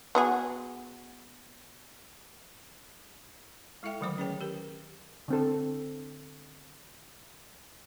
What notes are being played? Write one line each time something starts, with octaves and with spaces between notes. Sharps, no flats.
B3 F#4 G#4
G#3 E4 A4 E5 G5
D3 D#3 F#3 A3 C5 D6
F#3 C#4 G#4 B4 C#5 G5
G4 A#4
D3 C4 A4